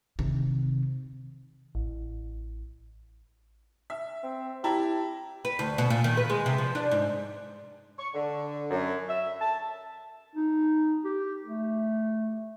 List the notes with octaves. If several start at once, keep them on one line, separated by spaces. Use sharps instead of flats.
C3 D#3
A1
E5
C4
E4 G4 A5 A#5
B4
D2
B2
A#2
D#3
B4
G#3
C3
F3
D4
G#2
C#6
D3
F#2
E5
A5
D#4
G4
A3